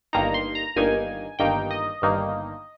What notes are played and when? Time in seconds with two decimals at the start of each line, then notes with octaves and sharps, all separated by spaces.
0.13 G1 G2 D#3 A#3 D#4 A#5
0.34 C6
0.55 A#5
0.76 G1 G2 D#3 A#3 D#4 G#5
1.39 G1 G2 D#3 A#3 D#4 G5
1.71 D#5
2.02 G1 G2 D#3 A#3 D#4